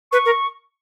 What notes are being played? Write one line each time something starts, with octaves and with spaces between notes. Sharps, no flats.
B4 C#6
A#4